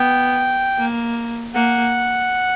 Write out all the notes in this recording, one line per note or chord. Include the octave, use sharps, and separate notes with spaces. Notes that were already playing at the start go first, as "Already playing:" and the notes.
Already playing: B3 G5
A#3
A#3 F#5